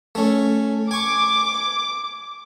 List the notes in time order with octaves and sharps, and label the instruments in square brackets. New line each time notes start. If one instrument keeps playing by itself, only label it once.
[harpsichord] A3 C#4
[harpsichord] G#5 C#6 [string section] D6